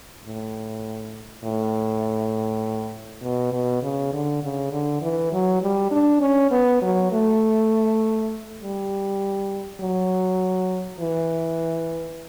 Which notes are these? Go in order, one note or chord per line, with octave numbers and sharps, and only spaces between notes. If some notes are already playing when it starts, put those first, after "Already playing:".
A2
A2
B2
B2
C#3
D3
C#3
D3
E3
F#3
G3
D4
C#4
B3
F#3
A3
G3
F#3
E3